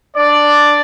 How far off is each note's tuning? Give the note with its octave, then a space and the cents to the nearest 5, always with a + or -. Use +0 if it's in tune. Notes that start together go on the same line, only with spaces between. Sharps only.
D4 +0 D5 +0